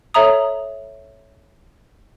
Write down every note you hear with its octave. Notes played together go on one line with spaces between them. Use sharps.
A4 C#5 E5 A#5 D#6